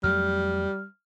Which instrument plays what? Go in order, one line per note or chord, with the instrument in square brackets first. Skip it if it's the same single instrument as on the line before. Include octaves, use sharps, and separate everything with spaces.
[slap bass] F2 F#3 A3 [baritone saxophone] G3 [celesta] F6